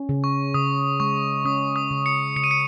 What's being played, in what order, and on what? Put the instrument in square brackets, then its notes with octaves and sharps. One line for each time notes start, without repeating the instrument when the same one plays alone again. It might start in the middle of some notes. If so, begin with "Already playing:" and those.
Already playing: [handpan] C#4
C#3
[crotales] C#6
[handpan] C#3 [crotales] D#6
[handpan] G#3 [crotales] C#6
[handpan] C#4 [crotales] D#6
[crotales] D#6
[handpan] C#3
[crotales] C#7
[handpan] C#3 [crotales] C#7
[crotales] D#7
C#7